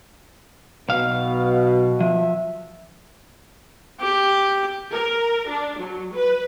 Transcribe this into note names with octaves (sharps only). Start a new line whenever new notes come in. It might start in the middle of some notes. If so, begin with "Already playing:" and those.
B1 B2 F5
F3 E5
G4
A#4
D4
F#3
B4